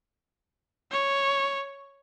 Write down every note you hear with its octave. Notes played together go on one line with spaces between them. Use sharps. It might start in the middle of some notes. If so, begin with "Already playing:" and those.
C#5